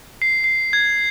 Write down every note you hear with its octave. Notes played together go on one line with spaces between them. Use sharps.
C7
C7
G#6